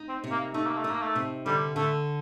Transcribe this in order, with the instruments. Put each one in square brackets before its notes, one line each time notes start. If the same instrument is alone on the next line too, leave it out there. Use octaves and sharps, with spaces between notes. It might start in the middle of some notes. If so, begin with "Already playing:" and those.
Already playing: [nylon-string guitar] D#4
[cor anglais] C4
[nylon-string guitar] C3
[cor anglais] A#3
[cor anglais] A3 [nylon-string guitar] D#4
[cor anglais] A#3
A3
[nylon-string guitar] D#4
[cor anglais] A#3
A3
[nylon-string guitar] C3
[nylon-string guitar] D3 [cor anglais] G3
[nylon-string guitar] D3 [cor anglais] A3